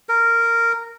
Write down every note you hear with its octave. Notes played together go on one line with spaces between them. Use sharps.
A#4